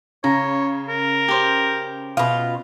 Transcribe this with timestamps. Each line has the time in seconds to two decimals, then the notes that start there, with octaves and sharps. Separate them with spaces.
0.24 C#3 C#5 A#5
0.89 A#4
1.28 G4 C5
2.17 B2 F4